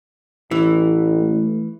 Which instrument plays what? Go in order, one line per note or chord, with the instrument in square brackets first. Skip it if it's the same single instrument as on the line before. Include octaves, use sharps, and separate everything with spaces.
[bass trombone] A1 [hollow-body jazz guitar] E3
[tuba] A3